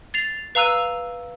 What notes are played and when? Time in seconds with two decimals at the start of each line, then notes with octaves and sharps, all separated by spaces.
0.14 A6 C7 F7
0.55 B4 F5 A#5 E6 F#6 D#7